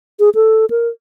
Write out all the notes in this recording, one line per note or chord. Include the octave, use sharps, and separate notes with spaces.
G#4
A4
A#4